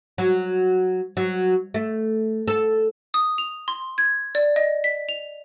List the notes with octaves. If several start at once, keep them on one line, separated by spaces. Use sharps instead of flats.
F#3
F#3
A3
A4
D#6
F7
C6
G#6
D5
D#5
B6
F7